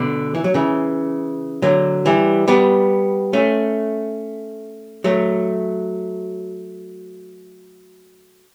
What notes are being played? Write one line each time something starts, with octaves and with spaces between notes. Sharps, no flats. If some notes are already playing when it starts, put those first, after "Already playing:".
Already playing: B2 D3
E3
F#3
C#3 E3
D3 F#3
E3 G3
G3 B3
A3 C#4
F#3 A3